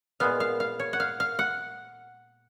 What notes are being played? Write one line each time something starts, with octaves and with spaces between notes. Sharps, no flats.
A#2 G#3 B3 F5
F5
F5
C#5
F#5
F5
F5
F#5